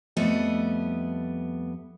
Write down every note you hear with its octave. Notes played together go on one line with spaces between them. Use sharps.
F2 G3 A3 B3 D#5